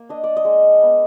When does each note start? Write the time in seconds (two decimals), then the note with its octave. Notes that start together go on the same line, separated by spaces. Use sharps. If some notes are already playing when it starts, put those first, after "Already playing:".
Already playing: A#3
0.09 D4 D#5
0.24 D5
0.37 D#5
0.45 G#3
0.81 B3